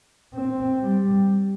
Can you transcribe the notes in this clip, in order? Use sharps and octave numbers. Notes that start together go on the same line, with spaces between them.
C4
G3